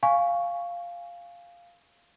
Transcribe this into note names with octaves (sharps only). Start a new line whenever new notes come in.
F5 G#5 C#6